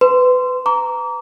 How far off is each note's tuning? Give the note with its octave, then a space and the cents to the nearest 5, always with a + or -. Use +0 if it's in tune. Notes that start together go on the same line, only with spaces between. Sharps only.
B4 +25 C6 -15
A#5 +0 D6 -30